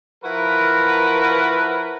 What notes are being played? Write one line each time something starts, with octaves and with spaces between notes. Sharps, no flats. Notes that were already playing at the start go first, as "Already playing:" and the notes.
F3 E4 F#4 A#4 B4